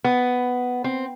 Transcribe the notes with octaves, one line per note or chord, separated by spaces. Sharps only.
B3
C4